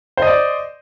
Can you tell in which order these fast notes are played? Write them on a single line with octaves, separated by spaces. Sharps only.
C5 D#5 D5